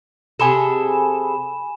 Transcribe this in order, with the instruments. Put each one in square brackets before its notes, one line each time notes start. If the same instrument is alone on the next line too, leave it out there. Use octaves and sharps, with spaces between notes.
[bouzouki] C3 G#4 A4 [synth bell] G#5 B5 E7